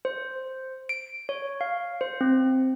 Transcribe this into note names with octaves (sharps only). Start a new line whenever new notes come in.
C5
D7
C#5
F5
C5
C4